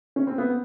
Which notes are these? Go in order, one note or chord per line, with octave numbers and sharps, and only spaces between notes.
C#4
C4
B3